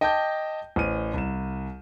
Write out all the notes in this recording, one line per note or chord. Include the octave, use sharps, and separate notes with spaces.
D#5 G5 A5 D6 G6
A1 C5 F6 D#7
C2 E7